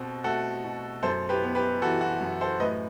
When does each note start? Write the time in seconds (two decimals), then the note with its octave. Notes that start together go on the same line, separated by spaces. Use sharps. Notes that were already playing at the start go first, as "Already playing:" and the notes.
Already playing: B2 C4 F#4 A4
0.24 A3 F#4 A4
0.64 B2
1.02 F#2 A4 C5
1.29 G4 B4
1.43 B3
1.55 G4 B4
1.82 E3 F#4 A4
2.01 F#4
2.21 F#2
2.41 A4 C5
2.60 A2 B4 D#5